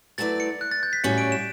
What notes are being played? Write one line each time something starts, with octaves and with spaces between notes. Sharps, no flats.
F#3 A3 E4 B4 D5 A6
C#7
F#6
A6
G6
B6
A2 G3 C#4 F#4 C#7
D7
E7